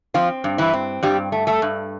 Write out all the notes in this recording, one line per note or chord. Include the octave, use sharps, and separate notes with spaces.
F3 C4 F4
G2
E3 E4
C4
G2 G3 G4
A3
A3 A4
G2